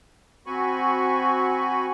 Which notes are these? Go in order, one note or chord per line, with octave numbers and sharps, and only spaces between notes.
C4 F#4 G#5 B5 C#6